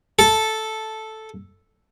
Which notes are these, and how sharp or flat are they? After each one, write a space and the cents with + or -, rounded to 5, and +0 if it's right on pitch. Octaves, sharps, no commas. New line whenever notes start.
A4 -5